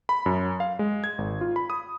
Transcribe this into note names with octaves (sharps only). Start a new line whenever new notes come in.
B5
F#2
F5
G#3
G#6
G#1
F4
B5
D#6